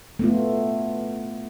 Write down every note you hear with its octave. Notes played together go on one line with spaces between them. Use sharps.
A3 B3 F4